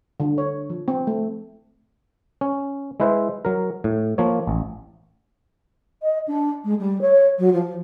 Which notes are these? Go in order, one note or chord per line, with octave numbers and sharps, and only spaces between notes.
D3
C#5
F3
C4
A3
C#4
G#3 E4 B4 C5 E5
F#3 A#4
A2
F3 A#3 C#5
A1
D#5
D4
G#3
G3
C#5
F#3
F3